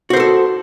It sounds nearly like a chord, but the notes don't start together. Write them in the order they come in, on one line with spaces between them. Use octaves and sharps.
F#4 C5 A#4 A4